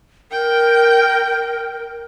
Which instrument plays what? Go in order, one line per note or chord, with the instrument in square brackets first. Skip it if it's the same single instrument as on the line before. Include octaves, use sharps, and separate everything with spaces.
[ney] A#4 [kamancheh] G5